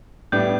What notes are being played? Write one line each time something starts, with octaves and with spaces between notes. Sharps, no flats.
A2 G3 B3 D4 G6